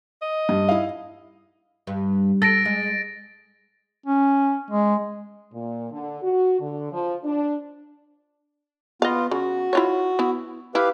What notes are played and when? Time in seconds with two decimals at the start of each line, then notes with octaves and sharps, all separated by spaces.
0.22 D#5
0.49 G2
0.69 E4 F5
1.87 G2
2.42 A4 A6 A#6 D7
2.65 G#3
4.06 C#4
4.70 G#3
5.53 A#2
5.91 D3
6.22 F#4
6.60 D3
6.92 F3
7.24 D4
9.02 B3 F4 D#5 F5
9.31 C#3 F#4
9.73 E4 F4 C#5
10.19 B3 E4
10.75 E4 G4 B4 F5